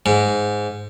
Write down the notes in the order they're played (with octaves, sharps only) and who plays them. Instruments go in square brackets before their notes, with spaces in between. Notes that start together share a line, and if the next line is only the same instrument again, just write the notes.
[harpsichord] G#2